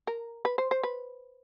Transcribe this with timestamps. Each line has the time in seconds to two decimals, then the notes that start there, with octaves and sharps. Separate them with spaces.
0.07 A#4
0.45 B4
0.58 C5
0.71 C5
0.83 B4